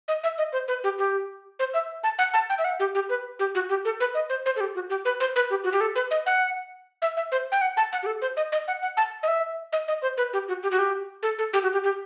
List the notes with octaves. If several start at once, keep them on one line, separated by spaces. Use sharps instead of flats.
D#5
E5
D#5
C5
B4
G4
G4
C5
E5
A5
F#5
A5
G5
E5
F#5
G4
G4
B4
G4
F#4
G4
A4
B4
D#5
C5
C5
A4
G4
F#4
G4
B4
C5
B4
G4
F#4
G4
A4
B4
D#5
F#5
E5
E5
C5
G5
F#5
A5
F#5
G4
A4
C5
D#5
D#5
F#5
F#5
A5
D#5
E5
D#5
D#5
C5
B4
G4
F#4
G4
F#4
G4
A4
A4
G4
F#4
G4
G4